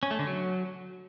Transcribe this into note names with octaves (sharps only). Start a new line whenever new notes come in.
C#4
A3
D3
F#3